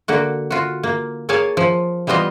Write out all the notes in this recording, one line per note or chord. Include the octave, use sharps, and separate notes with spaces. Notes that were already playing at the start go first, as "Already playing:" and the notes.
D3 A#3 F#4
F4 F#4
A#3
A#3 G#4 C#5 F5 G#5 A5
F3
E3 G3 B3 F4 D#5